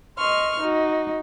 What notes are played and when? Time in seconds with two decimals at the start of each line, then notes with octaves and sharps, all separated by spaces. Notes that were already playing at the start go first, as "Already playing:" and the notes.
0.18 D#5 C6 C#6 F6
0.59 D#4 F#4